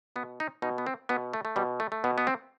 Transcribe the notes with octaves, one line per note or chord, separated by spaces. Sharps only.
B2 B3
D#4
B2 D#4
B3
C4
B2 B3
A3
A3
B2 G3
A3
A3
B2 B3
B3
C4